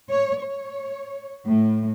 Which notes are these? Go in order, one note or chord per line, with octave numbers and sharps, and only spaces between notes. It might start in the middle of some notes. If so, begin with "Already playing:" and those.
C#5
C#5
A2